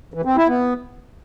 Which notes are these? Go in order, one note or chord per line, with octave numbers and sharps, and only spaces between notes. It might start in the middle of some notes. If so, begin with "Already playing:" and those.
E3
C4
E4
B3